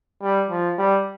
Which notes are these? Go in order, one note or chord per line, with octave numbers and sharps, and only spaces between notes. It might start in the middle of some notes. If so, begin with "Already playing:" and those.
G3
F3
G3